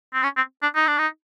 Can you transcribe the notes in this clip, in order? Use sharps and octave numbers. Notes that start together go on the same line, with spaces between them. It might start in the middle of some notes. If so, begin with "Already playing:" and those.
C4
C#4
C4
D4
D#4
D4
D#4